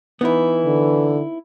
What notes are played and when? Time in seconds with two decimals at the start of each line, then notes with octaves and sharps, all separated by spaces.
0.21 E3 B3 D#4 E4
0.65 D3